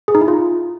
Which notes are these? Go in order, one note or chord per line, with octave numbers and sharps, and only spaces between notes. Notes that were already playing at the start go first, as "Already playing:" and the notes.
G#4
D#4
E4
F4